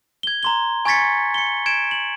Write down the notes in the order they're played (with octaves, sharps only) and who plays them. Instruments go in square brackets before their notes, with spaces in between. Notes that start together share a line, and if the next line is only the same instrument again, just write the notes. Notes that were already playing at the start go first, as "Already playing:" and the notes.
[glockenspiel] G#6 G7
A#5 C6 G7
G#5 C#6 G#6 A6 B6 C#7
C#7 G7
G#6 D7 E7
F#7